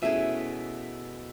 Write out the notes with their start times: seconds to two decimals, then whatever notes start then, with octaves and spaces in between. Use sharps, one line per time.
0.02 B2 A3 C#4 E4 G#4 E5